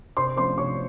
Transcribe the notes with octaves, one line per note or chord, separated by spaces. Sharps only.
C3 C5 C6
F3 A3 C#4 C5 C6
C3 C#5 C#6